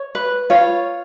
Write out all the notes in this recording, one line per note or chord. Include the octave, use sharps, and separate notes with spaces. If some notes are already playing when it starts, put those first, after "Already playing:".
Already playing: C#5
B4
F4 C#5